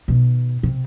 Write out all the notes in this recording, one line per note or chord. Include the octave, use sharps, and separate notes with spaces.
B2 D#3
C3